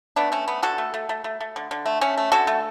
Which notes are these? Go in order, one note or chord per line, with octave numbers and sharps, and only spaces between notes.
A3 B3 D4
A3 C#4
A3 B3
D3 F#4 A4
A3
A3
A3
A3
A3
D3
D3
A3
A3 C#4
A3
D3 F#4 A4
A3